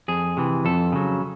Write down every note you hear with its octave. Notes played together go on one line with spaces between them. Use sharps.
F2 G#4
C3 E3
F2 A4
C#3 F#3